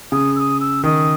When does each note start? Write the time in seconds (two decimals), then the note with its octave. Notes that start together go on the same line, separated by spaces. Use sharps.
0.12 C#3 D#6
0.36 E6
0.39 D#6
0.60 E6
0.84 D#3 D#6